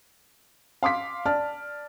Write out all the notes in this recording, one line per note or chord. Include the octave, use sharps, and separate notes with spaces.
F5 C6 D6 B6
D5 A5 F6